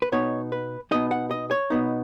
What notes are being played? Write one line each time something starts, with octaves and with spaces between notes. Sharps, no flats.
B4
B2 B3 D#4 C#5
B4
B2 B3 D#4 D#5
F#5
D#5
C#5
B2 B3 D#4